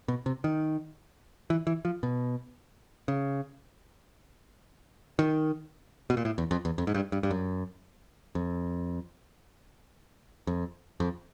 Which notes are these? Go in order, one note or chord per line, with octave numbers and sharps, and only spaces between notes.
B2
C3
D#3
E3
E3
F3
B2
C#3
D#3
B2
A#2
A2
E2
F2
E2
F2
G#2
G2
G2
G2
F#2
F2
F2
F2